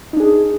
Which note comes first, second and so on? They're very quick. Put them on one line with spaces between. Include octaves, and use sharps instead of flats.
D#4 D4 G#4